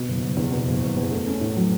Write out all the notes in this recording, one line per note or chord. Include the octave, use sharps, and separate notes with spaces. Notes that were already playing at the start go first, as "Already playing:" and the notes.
Already playing: B2
F#1
F#1
E2
B2
F#1
F#1
E2
A3
C#4
A2
F#3